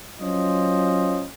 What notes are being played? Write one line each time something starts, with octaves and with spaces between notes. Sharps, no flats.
F#3 C#4 F4 C5 D#5